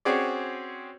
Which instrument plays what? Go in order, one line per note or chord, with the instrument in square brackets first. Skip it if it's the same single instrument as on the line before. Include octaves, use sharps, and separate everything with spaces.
[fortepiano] C4 C#4 F#4 G#4 C#5 D5